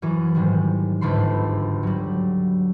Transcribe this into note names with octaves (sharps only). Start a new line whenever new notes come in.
F#2 E3 F#3
G#2 D#3 G3 G#3
G1 D2 G#2 A3 B5 C6
F#3 G3